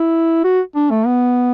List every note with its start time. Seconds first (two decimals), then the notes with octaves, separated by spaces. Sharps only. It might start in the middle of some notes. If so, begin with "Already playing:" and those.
Already playing: E4
0.44 F#4
0.75 D4
0.90 A3
1.06 B3